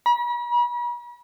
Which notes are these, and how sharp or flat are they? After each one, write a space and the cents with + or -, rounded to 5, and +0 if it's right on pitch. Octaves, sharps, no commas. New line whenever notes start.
B5 -45